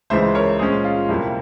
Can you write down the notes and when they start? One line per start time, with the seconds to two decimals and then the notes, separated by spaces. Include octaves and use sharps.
0.10 C#2 C#3 E3 G#3 C5 E5
0.35 A#4 C#5
0.59 A#2 G#3 C#4 G#4 C5
0.84 F4
1.09 F2 C3 G3 A#3 E4